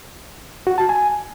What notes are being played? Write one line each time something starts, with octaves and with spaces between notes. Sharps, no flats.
F#4
A5
G#5